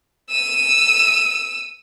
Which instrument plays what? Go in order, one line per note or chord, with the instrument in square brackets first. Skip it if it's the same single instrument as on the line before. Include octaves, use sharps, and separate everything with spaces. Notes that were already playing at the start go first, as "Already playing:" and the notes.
[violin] E6 D#7